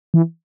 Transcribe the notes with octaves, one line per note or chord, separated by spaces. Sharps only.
E3